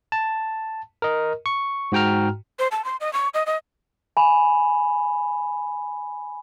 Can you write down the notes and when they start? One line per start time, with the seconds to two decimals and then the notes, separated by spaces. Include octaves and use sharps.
0.12 A5
1.02 A#4 D#5
1.46 C#6
1.92 G#2 F#4 G5 A#5 F6
2.59 C5
2.71 A5
2.84 C6
3.00 D#5
3.13 C#6
3.34 D#5
3.46 D#5
4.17 G#5 B5